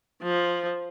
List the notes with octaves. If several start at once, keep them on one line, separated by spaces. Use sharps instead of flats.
F3